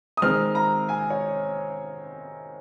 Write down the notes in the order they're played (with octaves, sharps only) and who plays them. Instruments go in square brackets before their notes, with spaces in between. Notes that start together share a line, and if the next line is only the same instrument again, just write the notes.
[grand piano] D#6
D#3 G#3 C4 D#4 F6
A#5
G#5
C#5